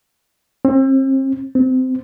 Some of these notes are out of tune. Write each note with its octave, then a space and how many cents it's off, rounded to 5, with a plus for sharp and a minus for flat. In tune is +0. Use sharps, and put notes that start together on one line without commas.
C4 +40
C4 -20